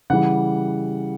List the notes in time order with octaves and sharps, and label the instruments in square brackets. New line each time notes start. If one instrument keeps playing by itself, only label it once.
[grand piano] C#3 E3 G3 F#5